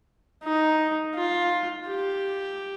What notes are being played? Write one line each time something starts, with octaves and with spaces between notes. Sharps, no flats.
D#4
F4
G4